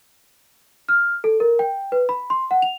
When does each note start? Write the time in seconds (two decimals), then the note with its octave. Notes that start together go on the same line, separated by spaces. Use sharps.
0.89 F6
1.24 A4
1.40 A#4
1.59 G5
1.92 B4
2.09 B5
2.30 C6
2.51 F#5
2.62 F7